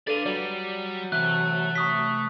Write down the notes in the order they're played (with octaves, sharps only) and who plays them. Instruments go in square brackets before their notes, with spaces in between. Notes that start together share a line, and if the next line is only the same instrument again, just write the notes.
[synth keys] D4 A4 B4 [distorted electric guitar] D5 F5 [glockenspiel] A6 D#7
[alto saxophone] F#3 [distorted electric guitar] G3 [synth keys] D5
[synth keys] C3 E3 [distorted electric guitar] A3 [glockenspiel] F#6
[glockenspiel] C#6 D#6 B6